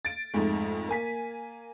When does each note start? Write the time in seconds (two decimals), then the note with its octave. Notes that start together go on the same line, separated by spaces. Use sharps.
0.05 A6 D7
0.34 F2 G#2 G#3 A3
0.89 A#3 G#5 B6